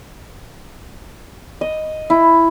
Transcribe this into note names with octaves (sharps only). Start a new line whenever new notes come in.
D#5
E4